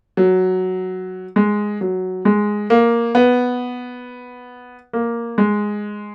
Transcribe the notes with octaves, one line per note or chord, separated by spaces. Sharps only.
F#3
G#3
F#3
G#3
A#3
B3
A#3
G#3